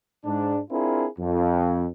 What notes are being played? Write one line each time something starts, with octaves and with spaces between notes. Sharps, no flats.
G#2 D4
C4 D4 E4 F4 G#4 A#4
F2